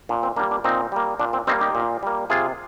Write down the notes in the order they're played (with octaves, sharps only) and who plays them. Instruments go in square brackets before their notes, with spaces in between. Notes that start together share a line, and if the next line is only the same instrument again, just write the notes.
[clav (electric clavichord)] A#2 D4
C4
A#3 D4
G3
D4
A#2 C4 D#4
G3 A#3
A#2 D4
C4
G3 A#3 C4 D#4
D#4 G4
A#2
G3 A#3
C3 F4 G#4